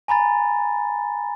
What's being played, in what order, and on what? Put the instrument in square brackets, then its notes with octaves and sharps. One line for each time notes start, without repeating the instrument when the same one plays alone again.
[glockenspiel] G#5 A#5 B5 A6